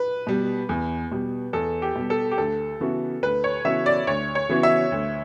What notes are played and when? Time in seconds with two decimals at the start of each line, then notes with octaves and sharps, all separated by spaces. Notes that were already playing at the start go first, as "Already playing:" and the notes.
Already playing: B4
0.27 B2 G3
0.69 E2
1.11 B2 G3
1.53 E2 A4
1.82 G4
1.95 B2 G3
2.10 A4
2.31 G4
2.38 D2 A4
2.80 C#3 E3 B3 F#4
3.22 D2 B4
3.44 C#5
3.65 C#3 E3 B3 F#4 E5
3.86 D5
4.07 D2 C#5
4.35 C#5
4.49 C#3 E3 B3 F#4
4.63 E5
4.92 D2